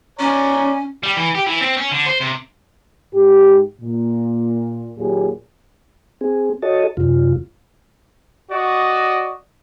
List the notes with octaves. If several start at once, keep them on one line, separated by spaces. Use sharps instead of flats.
C#4 C#5 D5 A#5
G3
E3
G4
E3
C4
C#4
D3
C5
C3
G#2 G4
A#2
D#2 A#2 F#3 G4 G#4
C4 G#4
F#4 A4 C#5 D#5 A5
F#2 C3 F4
F#4 D5 D#5